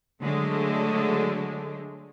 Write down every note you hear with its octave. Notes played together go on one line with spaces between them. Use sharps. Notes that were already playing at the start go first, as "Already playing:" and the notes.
D3 F#3 G#3 A3